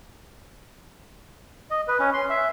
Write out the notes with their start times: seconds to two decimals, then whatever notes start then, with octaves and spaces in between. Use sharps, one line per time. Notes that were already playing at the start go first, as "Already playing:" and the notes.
1.71 D#5
1.88 B4
2.00 C#4
2.14 C6
2.30 E5